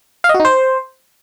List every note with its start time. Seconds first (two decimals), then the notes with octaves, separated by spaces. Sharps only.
0.24 F5
0.29 D#5
0.34 F#4
0.40 D#4
0.45 C5